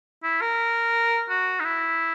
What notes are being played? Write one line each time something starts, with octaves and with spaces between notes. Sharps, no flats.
E4
A#4
F#4
D#4
E4